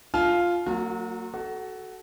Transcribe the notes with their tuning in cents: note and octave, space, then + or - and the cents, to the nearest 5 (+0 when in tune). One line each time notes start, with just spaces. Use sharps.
F4 +0 F5 +0 A5 -45
F#3 +0 A#3 -40 F#4 -45
F#4 +15 A4 -10